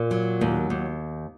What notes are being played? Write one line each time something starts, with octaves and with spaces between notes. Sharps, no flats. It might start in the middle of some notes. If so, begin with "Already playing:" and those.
Already playing: A#2
F#3
D#2
D#2